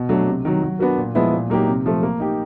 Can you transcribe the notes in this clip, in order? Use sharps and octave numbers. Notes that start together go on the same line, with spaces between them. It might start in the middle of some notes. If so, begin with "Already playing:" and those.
Already playing: B2
F#3 A3 D4
C3
D#3 F#3
F#3
B3 D4 F#4 A#4
A#2
F3 G#3 B3 E4
A#2
F#3 A#3 D#4 G4
C3
F3 A3
A#3
D#4 G4